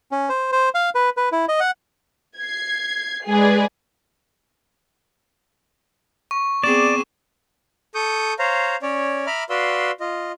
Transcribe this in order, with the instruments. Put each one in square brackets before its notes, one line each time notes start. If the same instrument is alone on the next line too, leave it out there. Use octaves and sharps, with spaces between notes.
[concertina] C#4
C5
C5
F5
B4
B4
E4
D#5
F#5
[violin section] G#6 [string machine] C7
[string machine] G#3 B4 D5 [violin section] G#4
[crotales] C#6
[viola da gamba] B3 C4 G#4 [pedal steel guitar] D5 [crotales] D6 E7
[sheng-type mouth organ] A4 C#6 D#6 G6
C5 C#5 F5 A#5
C#4 C#5 D5
E5 A#5 B5 D6 F6
F#4 B4 D5 F5 C6 E6
F4 D#5